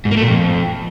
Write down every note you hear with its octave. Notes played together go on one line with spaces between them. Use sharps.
G#2
A#3
A3
A#2
F2